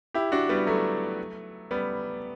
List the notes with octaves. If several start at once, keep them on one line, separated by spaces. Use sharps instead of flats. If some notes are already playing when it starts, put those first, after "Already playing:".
E4 G4
D4 F#4
G3 B3
F#3 A3
G3 B3